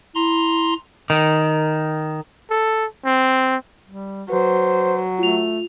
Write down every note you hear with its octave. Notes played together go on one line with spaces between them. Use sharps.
E4 A#5 C6
D#3
A4
C4
G3
F#3 B4 C5
A3 F4 F7